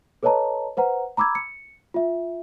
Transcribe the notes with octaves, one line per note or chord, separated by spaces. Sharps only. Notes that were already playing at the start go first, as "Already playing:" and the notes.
A4 B4 C#5 D#5 A5 A#5
B4 C5 F#5 A#5
A#5 B5 D6 E6 G#6
C#7
F4 E5